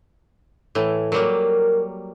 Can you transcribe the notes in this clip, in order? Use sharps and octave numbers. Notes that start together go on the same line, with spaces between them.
A2 E3
F#3 G3 A#3 A#4